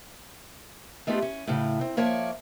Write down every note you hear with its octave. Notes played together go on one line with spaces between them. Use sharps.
G#3 A3 B3 F4 G4
C#4
A2 C#3
C4
F3 A#3 C#5 D5 E5 A5